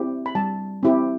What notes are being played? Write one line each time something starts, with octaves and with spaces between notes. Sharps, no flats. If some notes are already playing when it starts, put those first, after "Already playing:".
Already playing: C4 E4 G4
B5
G3 A5
C4 E4 G4